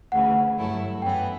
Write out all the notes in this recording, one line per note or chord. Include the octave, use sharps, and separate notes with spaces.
D2 C#3 E3 F#5
G2 F#3 A3 E4 A4
F#2 E3 B3 G5